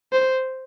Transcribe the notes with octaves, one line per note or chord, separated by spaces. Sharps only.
C5